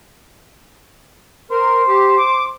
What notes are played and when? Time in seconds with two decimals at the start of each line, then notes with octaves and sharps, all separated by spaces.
1.51 A#4 C5
1.88 G4
2.17 D6